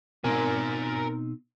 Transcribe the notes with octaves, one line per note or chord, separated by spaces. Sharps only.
B2 C4 D#4 A#4 G#5